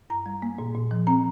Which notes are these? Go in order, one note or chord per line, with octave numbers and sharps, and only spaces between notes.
G2 A#5
G3
A#3
A#2
A#2
F3
C4 A#5